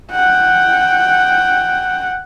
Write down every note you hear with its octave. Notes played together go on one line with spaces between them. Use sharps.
F#5 G5